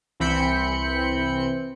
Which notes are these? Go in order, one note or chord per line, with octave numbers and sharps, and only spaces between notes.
C2 E3 C4 B5 G6 C#7